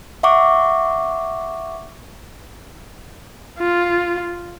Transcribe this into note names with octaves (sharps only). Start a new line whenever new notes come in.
E5 F#5 C#6 D6
F4